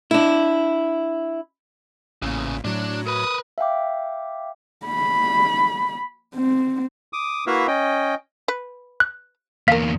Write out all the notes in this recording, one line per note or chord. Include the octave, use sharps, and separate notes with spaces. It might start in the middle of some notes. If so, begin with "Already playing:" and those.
D4 E4
A1 E2 A#2 C#3
A2 F#3 D4
A#4 B4 D#6
E5 F5 G5 D6
B5
C4
D6 D#6
A#3 E4 F#4 B4 E5 F5
C#4 D#5 G5
B4
F#6
E2 A#3 A#4 F5 B6